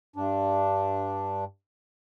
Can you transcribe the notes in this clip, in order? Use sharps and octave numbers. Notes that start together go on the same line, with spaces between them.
G2 D4